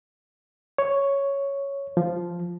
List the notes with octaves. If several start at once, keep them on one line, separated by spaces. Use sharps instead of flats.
C#5
F3